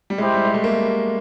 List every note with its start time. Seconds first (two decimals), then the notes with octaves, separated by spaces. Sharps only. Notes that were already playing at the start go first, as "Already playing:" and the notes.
0.10 G3
0.18 G#3 E4 G4 C5
0.34 G3
0.45 G#3
0.54 A3
0.64 A#3